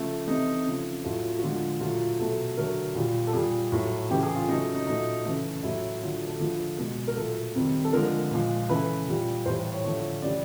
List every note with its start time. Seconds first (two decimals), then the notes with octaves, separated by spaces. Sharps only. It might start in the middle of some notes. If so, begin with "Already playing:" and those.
Already playing: C#3 F3 A3
0.27 C3 E3 A3 D#4
0.66 C#3 F3 A3
1.05 A2 F#3 A3 F4
1.38 F#4
1.42 D3 F3 G#3 F4
1.80 A#2 F#3 A3 F4
2.19 B2 F#3 A3 A4
2.57 D3 F#3 A3 A#4
2.95 A#2 G3
3.27 A4
3.33 A#2 G3 G#4
3.72 A2 F#3 A3
4.10 C#3 E3 A3 G4
4.23 G#4
4.36 F4
4.48 C#3 F#3 A3 D#4
4.74 D#4
4.87 A#2 F#3 A3 D#4
5.25 C#3 E3 A3
5.63 A2 F#3 A3 E4
6.02 D3 F#3 A3 F4
6.27 A4
6.40 D3 F3 A3 G#4
6.78 B2 G#3
7.07 A#4
7.16 A#2 F#3 A3 A4
7.55 C3 D#3 G3
7.84 A4
7.93 D3 F3 G#3 A#4
8.31 A#2 F3 G#3
8.69 C#3 E3 A3 B4
9.08 A#2 G3
9.46 A2 E3 G3 C5
9.72 C#5
9.84 D3 F3 A3 C#5
10.22 C#3 E3 G3 D5